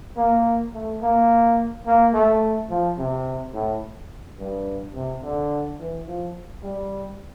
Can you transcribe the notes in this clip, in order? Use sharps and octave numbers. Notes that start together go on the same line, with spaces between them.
A#3
A3
A#3
A#3
A3
F3
C3
A2
G2
C3
D3
E3
F3
G3